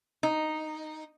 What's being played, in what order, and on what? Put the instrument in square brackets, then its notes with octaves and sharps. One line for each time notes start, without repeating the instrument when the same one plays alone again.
[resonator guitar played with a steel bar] D#4